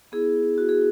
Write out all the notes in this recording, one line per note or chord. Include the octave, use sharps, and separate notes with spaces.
B3 E4 G#4
F#4
G#4